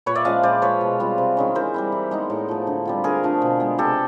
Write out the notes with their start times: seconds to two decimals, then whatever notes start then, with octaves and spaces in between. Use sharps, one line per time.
0.06 A#2 B4 C#5
0.15 D5 E5
0.25 F3 G#3 C#4 D#5 F5
0.43 A#2 C5 D5
0.62 F3 G#3 B4 C#5
0.81 B2
1.00 G3 C4 F4
1.18 C3
1.37 D#3 G#3 C#4
1.55 E3 A#4 C5
1.74 G3 C4 E4
1.92 E3
2.11 G#3 B3 D#4
2.30 A2
2.48 F3 A3
2.67 D3
2.85 G3 C4 F4
3.04 D3 G#4 A#4
3.23 F3 A3 D4
3.42 B2
3.60 G#3 B3
3.78 C3 G4 A4